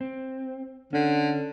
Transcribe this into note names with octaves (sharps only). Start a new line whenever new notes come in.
C4
D3 C#4